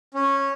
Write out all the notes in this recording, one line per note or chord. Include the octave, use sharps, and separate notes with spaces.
C#4